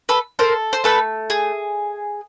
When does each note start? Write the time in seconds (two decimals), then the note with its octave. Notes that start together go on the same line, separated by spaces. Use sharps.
0.09 A4 B4
0.39 A4 A#4 C5
0.73 C5
0.84 A3 A4 B4
1.30 G#4